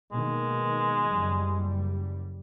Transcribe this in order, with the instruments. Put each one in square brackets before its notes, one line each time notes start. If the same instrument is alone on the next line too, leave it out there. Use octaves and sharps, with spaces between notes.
[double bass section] B2 D#3 A#3 [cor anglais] G#3
[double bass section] F#1 G3